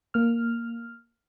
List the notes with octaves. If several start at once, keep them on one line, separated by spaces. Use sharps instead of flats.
A#3 F6